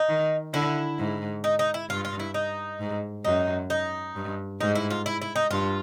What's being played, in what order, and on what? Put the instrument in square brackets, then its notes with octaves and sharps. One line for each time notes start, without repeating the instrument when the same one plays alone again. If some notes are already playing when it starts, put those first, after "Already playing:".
Already playing: [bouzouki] D#4
[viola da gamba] D#3
[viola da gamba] D3 [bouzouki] E4
[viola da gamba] G#2
[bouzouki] D#4
D#4
E4
[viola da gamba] G2 [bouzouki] F4
[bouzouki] F4
E4
D#4
[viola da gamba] G#2
[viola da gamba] F#2 [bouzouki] D#4
[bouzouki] D#4
[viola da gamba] G2
[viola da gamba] G#2 [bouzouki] D#4
[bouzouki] E4
F4
E4
E4
D#4
[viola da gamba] G2 [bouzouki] F4